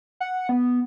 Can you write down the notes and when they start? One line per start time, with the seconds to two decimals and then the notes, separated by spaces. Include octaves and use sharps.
0.20 F#5
0.49 B3